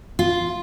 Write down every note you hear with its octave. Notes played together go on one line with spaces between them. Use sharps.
F4